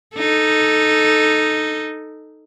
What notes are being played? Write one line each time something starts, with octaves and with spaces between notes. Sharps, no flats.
D#4 A4